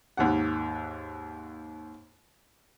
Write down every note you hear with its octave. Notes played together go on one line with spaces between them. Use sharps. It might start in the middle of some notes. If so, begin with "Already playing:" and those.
D#2 G#2 F#5